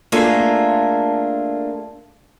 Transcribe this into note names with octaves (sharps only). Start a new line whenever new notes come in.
A3 A#3 D4 F4 G#4 A4